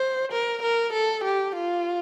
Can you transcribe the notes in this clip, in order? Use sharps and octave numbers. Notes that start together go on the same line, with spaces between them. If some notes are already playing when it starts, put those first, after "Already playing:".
Already playing: C5
A#4
A#4
A4
G4
F4